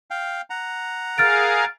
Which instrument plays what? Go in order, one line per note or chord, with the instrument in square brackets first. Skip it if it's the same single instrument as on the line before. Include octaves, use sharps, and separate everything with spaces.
[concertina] F5 G5
F#5 A#5
[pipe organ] G#4 A#4 F5 [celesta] F6 A6 D7